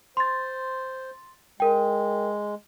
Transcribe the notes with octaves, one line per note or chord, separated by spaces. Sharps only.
C5 C6 A6
G#3 A#4 G5